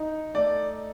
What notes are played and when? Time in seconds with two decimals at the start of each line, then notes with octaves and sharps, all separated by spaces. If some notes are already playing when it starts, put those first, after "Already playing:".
Already playing: D#4
0.34 A3 D5